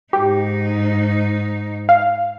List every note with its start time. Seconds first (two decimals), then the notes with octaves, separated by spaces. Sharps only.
0.13 G#2 D#4 G4
1.89 F5